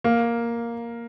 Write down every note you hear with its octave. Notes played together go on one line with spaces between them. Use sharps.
A#3